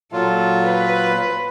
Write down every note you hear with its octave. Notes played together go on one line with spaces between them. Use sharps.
A#2 F#3 F4 A4
B4